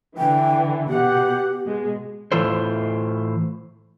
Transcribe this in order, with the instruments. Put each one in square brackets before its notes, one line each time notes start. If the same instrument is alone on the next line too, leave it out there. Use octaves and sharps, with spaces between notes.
[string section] D3 E3 [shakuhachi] G5
[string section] B2 F#5 [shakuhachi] G4
[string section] B2 G#3
[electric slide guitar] A2 E3 F4 A4 C5